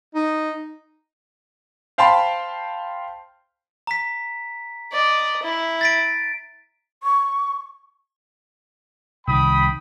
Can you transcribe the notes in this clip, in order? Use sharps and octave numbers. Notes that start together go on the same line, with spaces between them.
D#4
C5 F5 G5 A5 B5 C6
A#5 B6
D5 D#5
E4
A6 B6 D7
C#6
C2 D#3 G5 B5 D#6